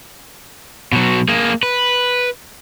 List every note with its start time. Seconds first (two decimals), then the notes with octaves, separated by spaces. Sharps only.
0.93 B2 F#3
1.28 A#3 G#4
1.63 B4